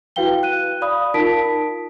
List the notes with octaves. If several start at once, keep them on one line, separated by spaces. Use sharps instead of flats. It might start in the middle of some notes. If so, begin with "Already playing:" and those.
E4 F#4 B4 F5 G5 G7
F#6 D#7
D5 F5 B5 D#6
D#4 F4 A#4 A5 B6 D7